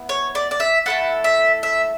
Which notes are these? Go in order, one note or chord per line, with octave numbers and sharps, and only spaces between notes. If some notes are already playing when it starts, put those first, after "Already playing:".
Already playing: B3 E4
C#5
D5
D5
E5
A3 E4 A4 F#5
E5
E5